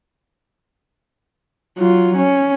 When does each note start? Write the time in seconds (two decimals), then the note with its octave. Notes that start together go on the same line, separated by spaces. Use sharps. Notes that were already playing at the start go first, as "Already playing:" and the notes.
1.78 F#3 F4
2.17 C#4